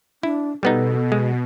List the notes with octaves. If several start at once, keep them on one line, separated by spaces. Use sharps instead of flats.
D4 E4
B2 G3 B3 D#4 A4
G#3